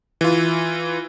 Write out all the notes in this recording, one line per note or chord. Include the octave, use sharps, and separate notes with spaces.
E3 F4